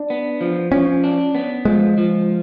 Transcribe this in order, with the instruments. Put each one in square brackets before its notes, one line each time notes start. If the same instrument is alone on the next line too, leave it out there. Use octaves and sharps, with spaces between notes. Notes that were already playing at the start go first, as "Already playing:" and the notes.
Already playing: [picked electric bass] D4
[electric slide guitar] B3
F3
[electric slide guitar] F3 [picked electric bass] C#4
[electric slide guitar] D4
B3
[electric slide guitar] F3 [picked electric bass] G#3
[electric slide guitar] F3